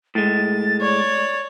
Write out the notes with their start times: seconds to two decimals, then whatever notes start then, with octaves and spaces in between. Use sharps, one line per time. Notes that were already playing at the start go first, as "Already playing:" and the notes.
0.15 A2 G#3 A6
0.81 C#5 D5